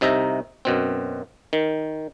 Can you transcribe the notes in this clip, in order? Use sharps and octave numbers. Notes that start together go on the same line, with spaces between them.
C2 C3 D#4 E5 A#5
F#2 B2 C4
D#3